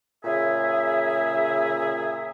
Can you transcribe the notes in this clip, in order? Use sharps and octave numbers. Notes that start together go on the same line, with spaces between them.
A#2 C#3 G#4 E5